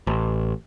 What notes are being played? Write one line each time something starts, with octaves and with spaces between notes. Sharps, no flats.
A1